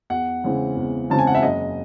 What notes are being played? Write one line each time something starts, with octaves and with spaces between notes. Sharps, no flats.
E2 F#5
C#3 E3 G#3 C4
E2
C#3 E3 G#3 C4 A5
G#5
F#5
E5
F#1 D#5